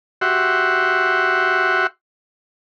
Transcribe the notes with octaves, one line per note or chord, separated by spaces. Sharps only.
F#4 G4 E5 F#5 C6